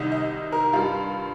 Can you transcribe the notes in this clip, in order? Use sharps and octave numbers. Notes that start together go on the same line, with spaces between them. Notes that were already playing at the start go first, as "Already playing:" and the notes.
Already playing: C2 C3 D#3 D#5
D#5
A#4
G2 G3 F4